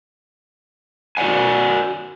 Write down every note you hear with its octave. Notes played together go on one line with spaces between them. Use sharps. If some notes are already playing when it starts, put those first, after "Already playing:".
F#4 D5 D#5 F#5 G#5